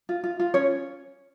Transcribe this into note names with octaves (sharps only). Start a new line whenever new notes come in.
F4
F4
F4
C#4 C#5